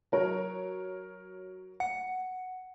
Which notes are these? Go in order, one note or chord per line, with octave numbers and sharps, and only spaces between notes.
F#3 A#4 C#5
F#5 C#7